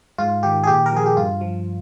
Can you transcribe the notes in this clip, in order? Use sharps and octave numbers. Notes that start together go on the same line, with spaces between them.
G#2 F4
D#3 G4
G#4
A#2 G4
A#4
F3 G#4
G4
G2 F4
F3